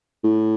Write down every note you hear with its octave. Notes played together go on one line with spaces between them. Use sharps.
A2